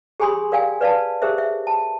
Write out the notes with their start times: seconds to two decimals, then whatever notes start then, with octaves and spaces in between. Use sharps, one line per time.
0.20 G4 G#4 G#5 B5 C6 D#6
0.52 A#4 D5 F5 G5 G#5
0.81 B4 D5 F5 A5
1.22 G4 G#4 A#4 C5 E5
1.38 E5
1.67 A5